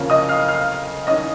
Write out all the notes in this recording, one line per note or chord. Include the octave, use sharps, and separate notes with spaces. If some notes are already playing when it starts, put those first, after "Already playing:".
Already playing: C#3 F3 A#3 C#4
D#5 D#6
F5 F6
F5 F6
D#3 C#4 D#5 D#6